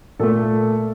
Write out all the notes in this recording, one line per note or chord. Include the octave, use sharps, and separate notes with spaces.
A#2 A3 A4